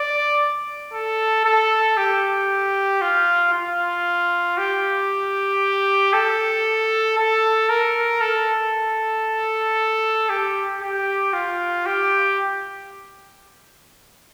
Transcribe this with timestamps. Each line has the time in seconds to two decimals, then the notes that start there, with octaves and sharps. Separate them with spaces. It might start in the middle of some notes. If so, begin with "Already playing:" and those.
Already playing: D5
0.93 A4
1.45 A4
1.97 G4
3.01 F4
3.53 F4
4.58 G4
6.13 A4
7.18 A4
7.70 A#4
8.21 A4
10.30 G4
10.81 G4
11.33 F4
11.86 G4